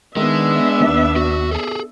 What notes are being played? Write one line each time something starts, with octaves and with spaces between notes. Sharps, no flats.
D#3 G#3 B3 D4 E5
D#2
F#4
G#4 A4